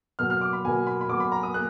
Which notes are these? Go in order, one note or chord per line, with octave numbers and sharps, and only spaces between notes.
B2 F#3 A#3 F6
F6
D6
B5
B2 F#3 A#3 G#5
B5
B5
B2 F#3 A#3 D6
B5
A#5
D#6
A#3 F#6